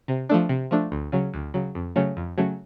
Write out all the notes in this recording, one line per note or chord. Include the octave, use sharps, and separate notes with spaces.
C3
F3 A3 D4
C3
F3 A3 D4
D2
C#3 F#3
D2
C#3 F#3
F2
C#3 F#3 A3 C#4
F2
C#3 F#3 A3 C#4